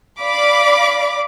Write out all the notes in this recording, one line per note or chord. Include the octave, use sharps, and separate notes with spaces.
D5 F5 B5 D6